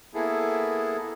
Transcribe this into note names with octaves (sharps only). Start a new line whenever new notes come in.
A#3 B3 E4 G#4 A4